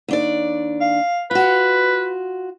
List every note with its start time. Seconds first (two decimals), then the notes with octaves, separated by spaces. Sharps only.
0.08 D#2 D4 D5
0.81 F5
1.31 F4 F#4 B4